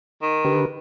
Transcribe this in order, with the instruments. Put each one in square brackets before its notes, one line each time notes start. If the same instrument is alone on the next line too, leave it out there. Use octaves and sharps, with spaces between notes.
[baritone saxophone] D#3
[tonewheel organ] D3 G4 B4